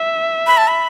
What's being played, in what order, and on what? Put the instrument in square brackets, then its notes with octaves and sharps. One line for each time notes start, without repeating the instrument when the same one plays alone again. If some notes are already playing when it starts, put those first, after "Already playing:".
Already playing: [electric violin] E5
[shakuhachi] B5
A5
B5